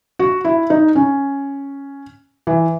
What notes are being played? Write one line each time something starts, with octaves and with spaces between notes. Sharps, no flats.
F#4
E4
D#4
C#4
E3